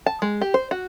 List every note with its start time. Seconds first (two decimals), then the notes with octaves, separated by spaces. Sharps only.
0.06 A5
0.22 G#3
0.41 G4
0.54 C5
0.71 F#4